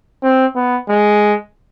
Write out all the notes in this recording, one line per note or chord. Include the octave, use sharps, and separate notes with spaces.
C4
B3
G#3